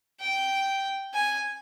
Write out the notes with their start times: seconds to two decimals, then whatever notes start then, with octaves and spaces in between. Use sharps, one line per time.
0.20 G5
1.14 G#5